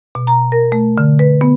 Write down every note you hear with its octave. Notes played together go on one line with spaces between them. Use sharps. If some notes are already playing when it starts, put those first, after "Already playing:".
B2
A#5
A#4
A3
D3
B4
B3